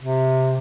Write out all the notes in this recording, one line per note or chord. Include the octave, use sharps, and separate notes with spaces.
C3